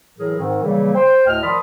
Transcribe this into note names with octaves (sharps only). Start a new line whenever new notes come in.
A2 E3 F#3 G#4 A#4
G#2 D#3 C4
C#3 E3 F#3 G3 A#3
C5 G5
D2 A2 D#5 F6
D#3 F3 D5 B5 C6 D#6